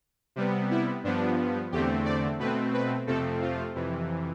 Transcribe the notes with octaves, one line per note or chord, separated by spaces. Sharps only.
C3 G3 B3
E4
G2 F3 B3 D4
E2 D3 A3 C4 G4
D5
B2 A3 C4 B4
B4
F2 C3 F3 A3 C4 A4
F4
F2 C3 E3